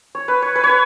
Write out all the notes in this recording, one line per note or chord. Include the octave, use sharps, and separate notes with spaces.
C#5
B4
C#5
B4
C#5
B4